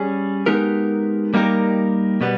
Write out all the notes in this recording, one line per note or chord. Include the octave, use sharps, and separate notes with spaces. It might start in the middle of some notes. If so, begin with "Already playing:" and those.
Already playing: G3 C#4 G#4
G#3 B3 D#4 G4 A#4
G3 A#3 D#4 G4 A#4
B2 G3 B3